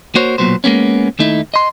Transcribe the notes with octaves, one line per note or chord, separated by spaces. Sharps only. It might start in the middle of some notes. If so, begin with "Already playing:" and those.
A#3 F#4 C5 C#5
B1 E2 A#2 F#3 B3 C5
G#3 A#3 B3 C#4
D#2 A3 D#4 E4
D#5 C6